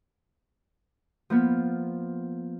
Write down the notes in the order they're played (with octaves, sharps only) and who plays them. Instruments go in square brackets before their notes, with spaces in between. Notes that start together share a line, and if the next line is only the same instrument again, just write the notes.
[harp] F3 A#3 B3